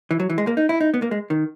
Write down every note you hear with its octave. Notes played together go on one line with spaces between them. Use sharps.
E3
F#3
E3
G#3
A#3
D#4
E4
D#4
B3
A#3
G#3
D#3